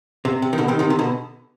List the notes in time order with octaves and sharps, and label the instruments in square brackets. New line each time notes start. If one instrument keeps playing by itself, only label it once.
[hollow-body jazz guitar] C3
C3
D#3
B2 D3
C3 D#3
C3 D#3
C3 D#3
B2 D3